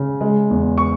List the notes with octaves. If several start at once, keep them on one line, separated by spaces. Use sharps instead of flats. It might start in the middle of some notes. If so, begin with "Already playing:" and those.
Already playing: C#3
G#3
E2
C#6